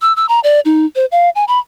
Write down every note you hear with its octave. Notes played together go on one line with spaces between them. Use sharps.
E6
E6
A#5
D5
D#4
C5
F5
G#5
B5